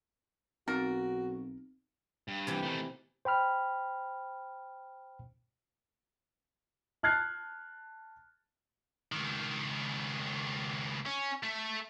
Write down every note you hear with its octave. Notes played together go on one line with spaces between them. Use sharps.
B1 C4 D#4 F#4 A#4
G2
C3 E3 B3
D#3 A3
C5 G5 B5 F6
A5 F6 F#6 G#6 A6 C7
C#2 D#3
C#4
A3